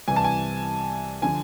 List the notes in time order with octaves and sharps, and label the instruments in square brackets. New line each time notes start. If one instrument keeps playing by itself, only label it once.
[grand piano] C2 C3 E3 G#5
A5
G#5
D3 F3 G#5